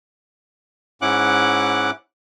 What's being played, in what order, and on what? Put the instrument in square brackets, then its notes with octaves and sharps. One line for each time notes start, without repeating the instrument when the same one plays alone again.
[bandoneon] G#2 C#4 E4 F#5 D6 F#6